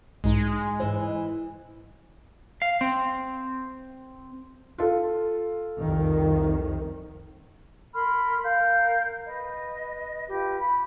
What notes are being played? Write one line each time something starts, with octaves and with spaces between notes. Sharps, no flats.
B1 G#2 G#3 D#4
G#2 E3 C5
F5
C4
F4 A4
C2 F2 D#3
A#4 B5 C6 F6
A#4 F5 G6
B4 D#5
F4 G4 B4
B5